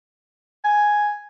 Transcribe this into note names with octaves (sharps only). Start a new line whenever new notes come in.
G#5